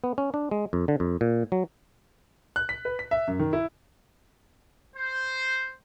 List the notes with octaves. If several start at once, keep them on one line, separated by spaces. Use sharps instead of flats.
B3
C#4
D4
G#3
F2
D3
F2
A#2
F#3
F#6
B6
B4
B6
E5
F#2
D#3
E4
C5